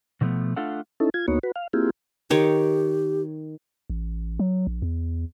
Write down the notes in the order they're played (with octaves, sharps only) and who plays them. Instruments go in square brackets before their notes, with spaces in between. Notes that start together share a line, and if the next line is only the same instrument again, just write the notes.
[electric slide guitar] B2 D3 F3 A3 B3
A3 D4 F4 A4 F5 F#5
[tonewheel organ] C#4 D#4 E4 A4
F4 G#6
D2 A#3 B3 D#4 F#4 C#5
F#4 B4
F5
A#3 C4 E4 F4 G4 G#4
[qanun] D#3 C#5 [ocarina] G4
[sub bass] A1
F#3
A#1
E2